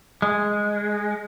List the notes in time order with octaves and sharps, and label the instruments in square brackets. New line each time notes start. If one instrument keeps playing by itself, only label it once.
[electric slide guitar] G#3